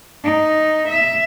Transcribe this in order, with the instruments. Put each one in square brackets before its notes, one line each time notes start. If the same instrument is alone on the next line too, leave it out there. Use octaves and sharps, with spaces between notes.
[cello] D#4
E5